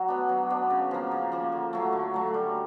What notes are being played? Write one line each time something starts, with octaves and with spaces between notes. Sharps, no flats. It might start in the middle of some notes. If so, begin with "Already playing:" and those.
Already playing: F#3
B3 D4
F#3
B3 D4
C#3
F3 A#3
C#3
F3 A#3
D3
F#3 A3
D3
F#3 A3
G3